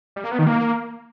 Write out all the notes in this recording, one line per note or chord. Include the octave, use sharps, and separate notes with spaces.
G3
A#3
B3
D#3
A#3